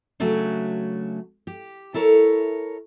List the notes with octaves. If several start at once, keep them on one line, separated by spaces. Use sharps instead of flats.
C#3 F#3 A3 D4 F#4
G4
E4 A4 A#4 C#5